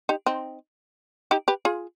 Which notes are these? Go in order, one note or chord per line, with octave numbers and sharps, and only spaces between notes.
D#4 G4
C4 D#4
D#4 G4
G4 B4
F4 G#4